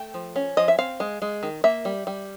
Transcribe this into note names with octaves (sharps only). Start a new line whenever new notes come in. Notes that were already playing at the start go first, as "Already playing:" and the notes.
Already playing: A3 G5
F3
C#4
F3 D#5
E5
C4 F5
G#3
G#3
D#3
A#3 E5
G3
G3